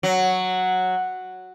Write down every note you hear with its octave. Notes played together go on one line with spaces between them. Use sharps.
F#3